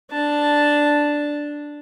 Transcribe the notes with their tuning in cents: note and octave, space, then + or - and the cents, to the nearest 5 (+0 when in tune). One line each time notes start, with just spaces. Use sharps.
D4 +0 A5 +0